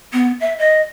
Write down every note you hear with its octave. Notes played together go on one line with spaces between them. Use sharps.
B3
E5
D#5